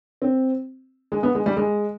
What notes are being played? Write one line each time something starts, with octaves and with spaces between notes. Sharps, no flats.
C4
G#3
B3
G#3
G3
G#3